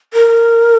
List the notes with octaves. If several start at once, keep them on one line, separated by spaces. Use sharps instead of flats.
A#4